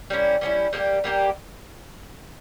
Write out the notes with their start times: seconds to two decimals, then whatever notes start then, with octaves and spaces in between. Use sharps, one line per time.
0.10 G3 A#3 C#4 E4
0.41 G3 A#3 C#4 E4
0.73 G3 A#3 D#4 G4
1.04 G3 A#3 D#4 G4